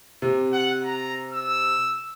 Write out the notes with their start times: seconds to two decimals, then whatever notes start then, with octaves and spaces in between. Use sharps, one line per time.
0.22 C3
0.53 F#5
0.84 A#5
1.33 E6